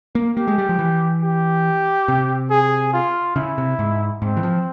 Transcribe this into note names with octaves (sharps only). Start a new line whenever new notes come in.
A#3
A#3 G4
G#3
G3
F3
E3
G4
C3
G#4
F4
C#3 E4
C3
G#2
G#2 C4
E3
F3